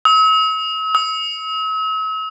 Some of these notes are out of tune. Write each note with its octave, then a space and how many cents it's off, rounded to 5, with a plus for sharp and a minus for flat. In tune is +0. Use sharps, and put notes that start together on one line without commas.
E6 -45
E6 -45